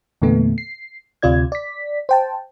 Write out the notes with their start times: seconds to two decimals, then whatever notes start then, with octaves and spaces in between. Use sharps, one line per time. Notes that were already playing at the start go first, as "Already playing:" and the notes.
0.22 E2 A#2 D3 A3 B3
0.58 C7
1.22 D2 C3 F4 D5 G#6
1.52 D5 B6
2.09 C5 G5 A5